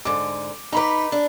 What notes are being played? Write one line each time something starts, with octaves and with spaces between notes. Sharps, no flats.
G#2 D3 D6
D#4 B4 A#5 B5 D6
D4